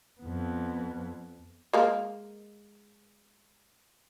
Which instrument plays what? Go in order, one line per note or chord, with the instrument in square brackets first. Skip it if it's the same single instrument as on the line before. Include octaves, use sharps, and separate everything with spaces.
[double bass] F2 B3
[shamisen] G#3 A#3 A#4